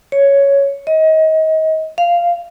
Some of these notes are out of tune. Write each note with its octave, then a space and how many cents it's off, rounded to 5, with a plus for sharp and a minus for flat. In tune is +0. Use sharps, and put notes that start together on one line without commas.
C#5 +5
D#5 +30
F5 -10